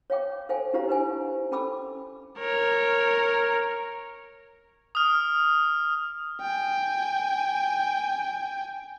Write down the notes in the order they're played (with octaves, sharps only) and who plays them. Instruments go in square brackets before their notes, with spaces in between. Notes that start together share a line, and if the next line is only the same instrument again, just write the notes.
[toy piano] C#5 F5 G5 D6
A4 C5 F5 G5 G#5
D4 E4 G4 C5 F5 A#5
D#4 B4 C5 G#5
C#4 A4 G5 B5 D6 E6
[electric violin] A#4 C#5
[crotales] D#6 F6
[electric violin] G5 G#5